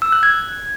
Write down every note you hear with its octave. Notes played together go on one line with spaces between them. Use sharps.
E6
F#6
G#6